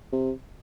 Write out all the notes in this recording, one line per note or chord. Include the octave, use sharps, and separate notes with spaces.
C3